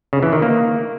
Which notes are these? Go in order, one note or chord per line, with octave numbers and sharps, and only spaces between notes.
C#3
E3
D#3
A#3